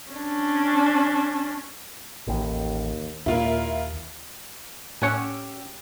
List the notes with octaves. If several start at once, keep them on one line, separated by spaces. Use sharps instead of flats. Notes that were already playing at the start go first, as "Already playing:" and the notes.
C#4 D4
A1 D#2 D#3
D#2 A#2 E4 F4 A#4
A2 C#4 G4 C#5 F#5 G#5 E6